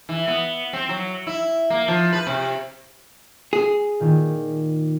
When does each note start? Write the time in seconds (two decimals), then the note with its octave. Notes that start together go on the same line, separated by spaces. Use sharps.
0.09 E3
0.28 B3
0.73 C4
0.89 F#3
1.27 E4
1.70 A#3
1.88 F3
2.13 B4
2.27 C3
3.53 G#4
4.00 A#2 D#3 F4